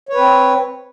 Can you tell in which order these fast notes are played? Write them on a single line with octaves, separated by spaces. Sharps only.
C#5 B4 C4